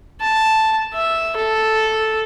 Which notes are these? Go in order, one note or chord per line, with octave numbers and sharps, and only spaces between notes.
A5
E5
A4